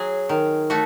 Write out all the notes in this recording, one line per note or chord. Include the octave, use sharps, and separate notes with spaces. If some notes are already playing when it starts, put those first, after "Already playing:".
Already playing: F#3 G#4
D#3
A3 F#4